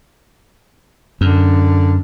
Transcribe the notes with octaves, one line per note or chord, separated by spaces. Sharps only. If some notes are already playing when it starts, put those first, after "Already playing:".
F#2 D3